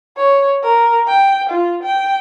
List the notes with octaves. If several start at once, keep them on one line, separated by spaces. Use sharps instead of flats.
C#5
A#4
G5
F4
G5